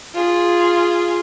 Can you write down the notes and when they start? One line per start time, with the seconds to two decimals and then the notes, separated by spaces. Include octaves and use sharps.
0.15 F4 G#4